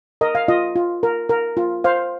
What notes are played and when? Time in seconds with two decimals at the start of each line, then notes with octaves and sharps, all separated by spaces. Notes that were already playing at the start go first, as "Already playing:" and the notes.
0.21 A#4 D#5
0.35 F5
0.48 F4 D#5
0.76 F4
1.03 A#4
1.29 A#4
1.57 F4
1.84 C5 F5